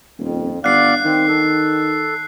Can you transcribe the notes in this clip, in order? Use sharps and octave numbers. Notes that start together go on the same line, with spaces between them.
D#1 F2
G1 D5 F5 F#5 F#6 C7
D#3 C4
A4